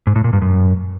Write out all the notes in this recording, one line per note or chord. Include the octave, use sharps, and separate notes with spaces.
G#2
A2
A#2
G2
F#2